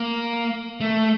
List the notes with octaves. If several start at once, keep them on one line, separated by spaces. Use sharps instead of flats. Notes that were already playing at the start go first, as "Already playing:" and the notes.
Already playing: A#3
A3